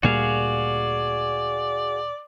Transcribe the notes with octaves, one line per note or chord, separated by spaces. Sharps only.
D2 A#2 G3 F#4 G#4 D5 F5